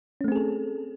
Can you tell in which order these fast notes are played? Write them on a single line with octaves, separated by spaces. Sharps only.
C#4 A3 C4 G#4 A4